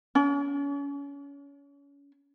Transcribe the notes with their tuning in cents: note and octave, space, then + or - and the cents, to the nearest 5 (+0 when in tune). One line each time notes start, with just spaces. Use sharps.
C#4 +30